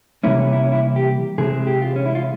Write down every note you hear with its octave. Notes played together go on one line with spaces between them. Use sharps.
C3 E3 G3 A#3 C#4 E4
C#4
E4
C#4
E4
G4
C3 E3 G#3 C4 G#4
G4
F4
C#4
E4
F4